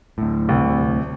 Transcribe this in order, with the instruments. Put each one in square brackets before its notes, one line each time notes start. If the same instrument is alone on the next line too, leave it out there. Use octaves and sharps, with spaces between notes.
[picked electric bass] D2 A2
[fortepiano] C2